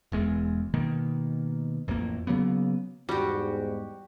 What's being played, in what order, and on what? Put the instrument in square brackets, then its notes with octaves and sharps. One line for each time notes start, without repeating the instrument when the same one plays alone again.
[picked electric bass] E1 E2 G#3
B2 D#3 A#3
A1 F2 A2 A#3
C#3 F#3 A#3 B3
[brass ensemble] E2 G#2 [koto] G3 [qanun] F#4 G4